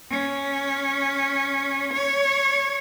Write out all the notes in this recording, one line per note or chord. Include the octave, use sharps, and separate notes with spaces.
C#4
C#5